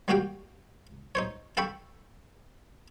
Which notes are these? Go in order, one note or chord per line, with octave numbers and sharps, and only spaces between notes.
G3 A#3 F#4 G4 F5 G5
D#4 C5 C#5
A4 F5 G5 B5 C#6